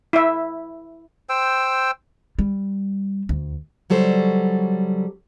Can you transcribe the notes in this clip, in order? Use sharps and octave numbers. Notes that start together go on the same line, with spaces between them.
E4 E5
C5 G5 E6
G3
D2
C#3 F#3 G3 A4 C5